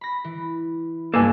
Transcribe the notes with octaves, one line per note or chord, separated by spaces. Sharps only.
B5 A#6
E3
C#2 G2 A3 A#3 A4 B4 G#5